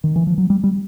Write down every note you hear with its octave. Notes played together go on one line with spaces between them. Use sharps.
D#3
E3
F3
F#3
G3
G3